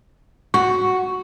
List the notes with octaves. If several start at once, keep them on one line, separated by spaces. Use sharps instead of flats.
F#4 C#6